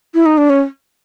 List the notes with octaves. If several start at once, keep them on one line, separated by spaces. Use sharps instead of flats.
E4
D#4
D4
C#4